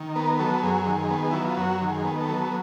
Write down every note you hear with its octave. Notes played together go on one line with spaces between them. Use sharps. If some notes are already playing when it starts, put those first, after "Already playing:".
Already playing: D#3
B3 A#4
F#3 A4
F#2 G#4
D#3
B3
F#3 E4
F4
F#2 F#4
D#3
G#4
B3
A4
F#3